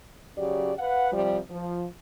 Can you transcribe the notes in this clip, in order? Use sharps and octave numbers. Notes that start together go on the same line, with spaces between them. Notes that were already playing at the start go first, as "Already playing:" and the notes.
C#3 F#3 G4 D5
B4 F5 F#5
C3 F3 G3
F3